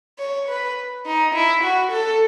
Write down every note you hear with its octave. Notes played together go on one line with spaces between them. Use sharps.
C#5
B4
D#4
E4
F#4
A4